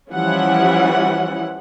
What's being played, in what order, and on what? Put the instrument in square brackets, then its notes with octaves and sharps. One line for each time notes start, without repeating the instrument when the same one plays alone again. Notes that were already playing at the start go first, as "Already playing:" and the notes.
[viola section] E3 F3 G3 C#4 E4 F#5